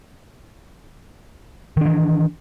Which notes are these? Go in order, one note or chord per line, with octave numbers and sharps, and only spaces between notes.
D#3 E3 D4